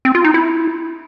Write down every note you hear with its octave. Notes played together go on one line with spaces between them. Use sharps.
C4
F4
D#4
E4